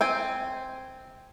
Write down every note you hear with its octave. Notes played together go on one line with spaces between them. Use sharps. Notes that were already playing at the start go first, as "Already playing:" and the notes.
C4 G5 G#5